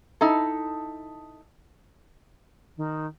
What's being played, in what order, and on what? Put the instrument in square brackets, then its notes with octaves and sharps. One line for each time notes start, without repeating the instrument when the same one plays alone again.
[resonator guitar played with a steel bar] D#4 E4 A4
[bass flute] D#3